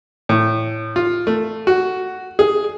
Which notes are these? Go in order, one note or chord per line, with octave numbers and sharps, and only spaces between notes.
A2
F4
A3
F#4
G#4